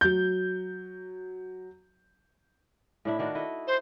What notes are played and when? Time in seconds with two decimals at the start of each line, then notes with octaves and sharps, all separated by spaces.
0.01 F#3 G6
3.05 A2 D4 E4
3.19 D#3 D4 F#4
3.35 E4 A4 D#5
3.67 C5